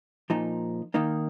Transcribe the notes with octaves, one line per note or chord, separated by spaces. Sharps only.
A#2 F3 D#4
D#3 A#3 D#4